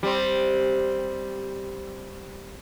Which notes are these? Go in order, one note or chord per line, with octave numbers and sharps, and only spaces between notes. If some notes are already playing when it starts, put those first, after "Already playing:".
G3 C4